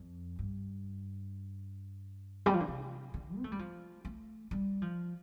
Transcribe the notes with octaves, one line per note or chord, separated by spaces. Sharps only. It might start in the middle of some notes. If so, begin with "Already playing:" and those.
Already playing: F2
G2
G3
F3
D3
C3
D3
C4
A3
G3
F3
A3
G3
F3